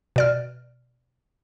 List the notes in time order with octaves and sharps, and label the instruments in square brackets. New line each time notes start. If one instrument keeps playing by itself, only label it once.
[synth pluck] B2 D5 F6